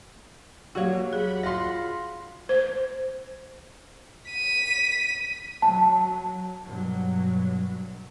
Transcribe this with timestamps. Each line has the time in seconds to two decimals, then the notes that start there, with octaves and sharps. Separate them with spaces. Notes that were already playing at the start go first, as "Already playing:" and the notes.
0.75 F#3 A#3 F#4 G4 C#5 F5
1.13 D2 G#4 F#5 B5
1.43 F4 C6 A#6
2.49 C5
4.31 B6 D#7
5.62 F#3 A5
6.65 G2 B2 F#3